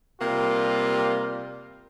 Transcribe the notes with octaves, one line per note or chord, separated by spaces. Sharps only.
C3 G3 A#3 F4